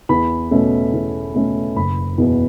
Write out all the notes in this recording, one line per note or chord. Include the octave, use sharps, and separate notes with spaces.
E2 B5
B2 A3 C#4
E2
B2 A3 C#4
F#1 B5
E2 B2 B3